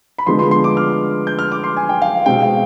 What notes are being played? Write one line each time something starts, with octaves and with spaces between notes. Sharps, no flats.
B5
D3 F3 G#3 B3 C6
C6
C6
D6
F6
G6
F6
D6
C6
G#5
G5
F5
B2 G#3 C4 G5
F5